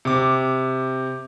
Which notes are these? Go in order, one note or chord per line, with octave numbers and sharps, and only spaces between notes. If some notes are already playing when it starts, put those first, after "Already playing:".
C3 D6